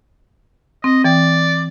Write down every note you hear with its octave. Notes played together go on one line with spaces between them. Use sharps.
C4 D#5
E3 D5 G5